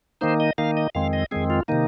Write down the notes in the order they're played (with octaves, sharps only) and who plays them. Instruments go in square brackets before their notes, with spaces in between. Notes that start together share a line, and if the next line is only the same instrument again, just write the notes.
[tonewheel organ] D#3 A#3 D#4 C5
D#5
D#3 A#3 D#4 F5
D#5
F2 D#3 G#3 C4 F5
D#5
F2 D#3 G#3 C4 G#4
F4
C3 D#3 A#3 D#4